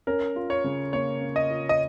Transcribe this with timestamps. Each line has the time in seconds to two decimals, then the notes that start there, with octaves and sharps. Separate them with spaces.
0.07 C#4 A#4
0.36 F4
0.50 C#5
0.64 C#3
0.93 A#3 C#5
1.21 C#4
1.36 D#5
1.50 F4
1.69 D#5